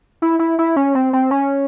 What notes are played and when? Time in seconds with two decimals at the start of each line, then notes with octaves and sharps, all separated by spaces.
0.22 E4
0.39 E4
0.59 E4
0.76 C#4
0.95 C4
1.13 C4
1.31 C#4